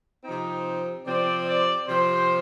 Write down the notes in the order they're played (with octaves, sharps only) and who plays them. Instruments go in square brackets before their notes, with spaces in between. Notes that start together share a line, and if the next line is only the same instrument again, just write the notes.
[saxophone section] C3 F3 C4 [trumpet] D#4
[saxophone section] C3 F3 C4 [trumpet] D5
[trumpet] D5
[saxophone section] C3 F3 C4 [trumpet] C5